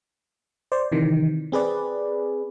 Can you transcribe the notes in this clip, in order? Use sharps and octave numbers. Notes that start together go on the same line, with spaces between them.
C5 D5
C3 D#3 E3
C4 G#4 B4 D5